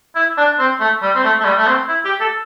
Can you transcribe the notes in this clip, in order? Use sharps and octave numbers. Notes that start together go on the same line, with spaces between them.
E4
D4
C4
A3
G3
C4
A3
A3
G3
A3
C4
E4
G4
A4